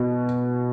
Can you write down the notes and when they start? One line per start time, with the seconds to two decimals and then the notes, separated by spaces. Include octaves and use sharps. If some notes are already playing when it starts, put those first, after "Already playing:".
Already playing: B2